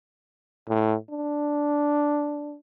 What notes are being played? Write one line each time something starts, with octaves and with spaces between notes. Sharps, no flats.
A2
D4